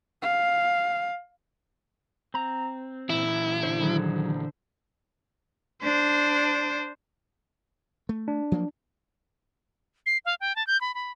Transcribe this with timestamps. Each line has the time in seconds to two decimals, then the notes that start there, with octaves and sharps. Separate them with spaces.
0.22 F5
2.34 C4 A#5
3.10 A#2 E3 E4
3.63 D3 C5
3.81 D#3 F#3 G#4
5.83 D4 C5
8.09 A3
8.28 D4
8.52 F3 F#3 A#3
10.06 C7
10.25 F5
10.41 G5
10.56 A5
10.67 G6
10.81 B5
10.95 B5